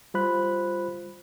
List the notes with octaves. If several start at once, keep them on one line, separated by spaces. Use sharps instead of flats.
G3 F4 C5 B5 F#6